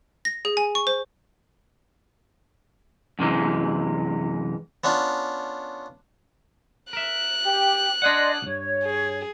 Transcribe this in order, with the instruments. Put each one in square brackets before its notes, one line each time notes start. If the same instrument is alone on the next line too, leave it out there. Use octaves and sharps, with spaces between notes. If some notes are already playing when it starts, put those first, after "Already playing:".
[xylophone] A#6
G#4
G#5
C#6
C5
[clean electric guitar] F#2 C3 E3 G#3
[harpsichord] B3 C#4 D4 F4
[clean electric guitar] A#4 E5 [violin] F#6
[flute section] G4
[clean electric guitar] D4 G#4 F#5 [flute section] D5 D#5 C6
[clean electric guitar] C2 G2 [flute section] C#5
[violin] G#4